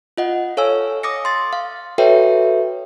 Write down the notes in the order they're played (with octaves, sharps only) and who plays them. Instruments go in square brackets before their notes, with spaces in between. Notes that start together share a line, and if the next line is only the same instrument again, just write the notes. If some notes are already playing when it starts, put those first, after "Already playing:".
[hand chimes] F4 D#5 F#5
A4 C#5 F5 G#5 E6
D6 D#6 A#6 C#7
C6 A6
F5
F#4 A4 B4 C#5 E5 G5